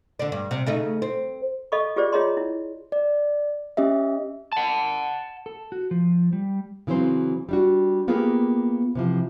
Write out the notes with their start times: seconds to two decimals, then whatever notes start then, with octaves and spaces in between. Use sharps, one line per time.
0.19 D3 D4
0.32 G2
0.51 C3
0.66 C#3 A3 D#4
1.02 C4
1.72 A4 D#5 F5 B5 C#6
1.96 F4 G4 G#4 C5 D5
2.13 F4 G#4 C#5 D#5 A#5 C6
2.37 E4
2.92 D5
3.77 C#4 G4 D#5 E5
4.53 F#5 A5
5.46 A4
5.72 F#4
5.91 F3
6.33 G3
6.87 C#3 E3 F#3 C4 C5
7.49 G3 D4 F#4
8.08 A#3 B3 F4 G4 G#4 A#4
8.95 C3 E3 F3